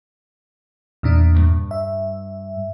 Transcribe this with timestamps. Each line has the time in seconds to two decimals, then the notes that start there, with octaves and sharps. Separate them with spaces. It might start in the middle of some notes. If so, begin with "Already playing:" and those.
1.03 E2 A#2 D4
1.35 C2 G2
1.71 E5